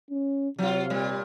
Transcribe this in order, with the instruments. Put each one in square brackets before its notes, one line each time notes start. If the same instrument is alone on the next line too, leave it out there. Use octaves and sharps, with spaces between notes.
[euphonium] C#4
[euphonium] C3 [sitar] F#3 F4
[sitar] A#2 G3